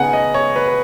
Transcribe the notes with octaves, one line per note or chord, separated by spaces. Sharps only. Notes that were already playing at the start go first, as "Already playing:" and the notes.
Already playing: C#3 B3 D#4 F#5 G#5
D#5
C#5
B4
B4